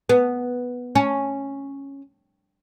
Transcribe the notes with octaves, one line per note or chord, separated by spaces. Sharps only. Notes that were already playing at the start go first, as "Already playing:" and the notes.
B3
C#4